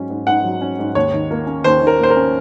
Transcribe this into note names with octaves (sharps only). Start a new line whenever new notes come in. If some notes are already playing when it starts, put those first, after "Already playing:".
Already playing: G#2 F#3 C#4
G#2
G#2 F#5
F#3
C#4
G#2
D#2 C#5
D#3
A#3
C#4
D#2 C5
D#3
A#4
A#3
C5
A#4
C#4